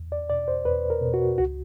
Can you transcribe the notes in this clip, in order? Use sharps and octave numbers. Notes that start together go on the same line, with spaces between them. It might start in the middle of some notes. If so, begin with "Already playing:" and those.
Already playing: E2
D5
B2 D5
C5
E2 B4
A#4
B2
F#4
C#2 F#4